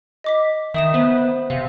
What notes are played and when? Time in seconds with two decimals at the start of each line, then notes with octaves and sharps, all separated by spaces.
0.24 D#5 D6 B6
0.74 D#3 E5 D#6 E7
0.94 B3 C5
1.50 C3 F5